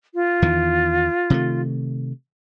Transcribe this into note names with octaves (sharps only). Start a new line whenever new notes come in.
F4
E2 D#3 E3
C3 D#3 A3